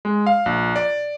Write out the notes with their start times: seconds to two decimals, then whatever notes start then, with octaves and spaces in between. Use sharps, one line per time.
0.05 G#3
0.27 F5
0.46 A#1
0.76 D5